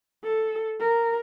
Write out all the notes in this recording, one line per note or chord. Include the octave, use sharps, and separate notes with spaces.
A4
A#4